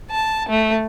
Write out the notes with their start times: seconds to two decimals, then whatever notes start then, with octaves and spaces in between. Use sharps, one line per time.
0.10 A5
0.48 A3